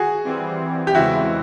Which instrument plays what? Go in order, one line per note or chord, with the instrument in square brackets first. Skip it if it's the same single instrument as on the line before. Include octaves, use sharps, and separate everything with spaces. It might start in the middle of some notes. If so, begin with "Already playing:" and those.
Already playing: [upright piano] F#4 G#4
[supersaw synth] E3 G3 C4
[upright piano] G4
[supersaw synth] E2 C#3 E3 G#3 C4 [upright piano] E4 F#4